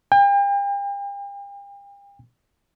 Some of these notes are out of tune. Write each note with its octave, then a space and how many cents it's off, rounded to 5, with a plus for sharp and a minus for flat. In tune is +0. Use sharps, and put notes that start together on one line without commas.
G5 +40